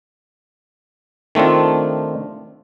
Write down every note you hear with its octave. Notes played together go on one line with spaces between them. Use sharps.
D#3 A3 C4 D4 F4